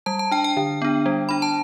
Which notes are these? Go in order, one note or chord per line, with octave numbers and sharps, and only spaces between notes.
G3 A5
A5
D4 G5
G5
D3
B3 D4
G3
D4 B5
A5